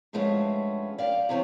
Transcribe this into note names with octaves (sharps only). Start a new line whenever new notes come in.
G2 F3 G#3 A3 B3 C#4
D5 F5 G5
E2 C3 C4 C#5